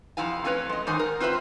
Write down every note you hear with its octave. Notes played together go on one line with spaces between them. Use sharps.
F2 C3 E4 F5 G#5
A3 C4 C#4 B4 C#5
G#3 D#5
G#2 D#3 E3 D#4 C5 G#5
A#4
C4 F4 B4 C5 E5